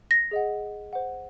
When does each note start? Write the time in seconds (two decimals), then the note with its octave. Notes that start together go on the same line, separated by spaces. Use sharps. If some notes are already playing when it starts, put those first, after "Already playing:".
0.11 A#6
0.31 G#4 D#5 F#5
0.93 C5 F#5